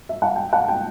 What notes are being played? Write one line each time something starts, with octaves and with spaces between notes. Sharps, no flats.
E5
F#5
G5
F#5
G5